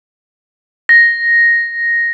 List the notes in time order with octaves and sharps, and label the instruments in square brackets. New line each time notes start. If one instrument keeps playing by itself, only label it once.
[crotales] A#6